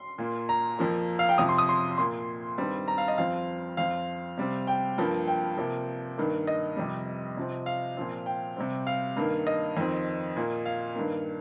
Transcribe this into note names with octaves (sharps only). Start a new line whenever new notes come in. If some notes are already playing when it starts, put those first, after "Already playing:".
Already playing: C6
A#2 A#3
A#5
F2 F3 A#3
F5
G5
F2 C3 F3 D#6
C6
D#6
C6
A#2 A#3 C6
G2 D#3 G3 C4
A#5
F5
D#5
F2 F3 C4 F5
F2 F3 C4 F5
C3 G3 C4
G5
G2 F3 A#3
G5
C3 F3 A#3
G2 D#3 A#3
D#5
F2 C3 G3
C3 F3 C4
F5
A#2 F3 C4
G5
C3 G3 C4
F5
G2 D#3 A#3
D#5
F2 D#3 C4
A#2 A#3
F5
G2 D#3 A#3